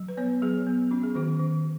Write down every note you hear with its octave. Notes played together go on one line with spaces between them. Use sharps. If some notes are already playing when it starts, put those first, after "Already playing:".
Already playing: F#3
B4
B3 C#5
F#3 G#4
B3
C#4 F#4
G#4
D#3 F#4
D#3